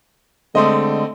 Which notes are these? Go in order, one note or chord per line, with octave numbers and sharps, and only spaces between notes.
D3 G#3 A3 C4 D#5